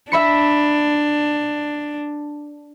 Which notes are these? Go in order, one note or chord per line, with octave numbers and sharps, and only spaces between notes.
D4 E5 B5 C#7